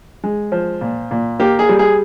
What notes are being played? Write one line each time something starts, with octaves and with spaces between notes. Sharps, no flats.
G#3
F3
A#2
A#2
A#3 G4
G#4
G3
G#4